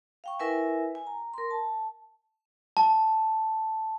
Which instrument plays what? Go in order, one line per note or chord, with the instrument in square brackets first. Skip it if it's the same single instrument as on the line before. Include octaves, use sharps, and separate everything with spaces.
[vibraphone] F5 G5 C#6
E4 A#4 B4 E5 G#5
G#5
A#5
A#4 C6
A5
[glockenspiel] A5